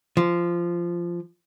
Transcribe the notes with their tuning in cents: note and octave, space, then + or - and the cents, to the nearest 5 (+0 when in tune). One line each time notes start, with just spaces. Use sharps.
F3 -15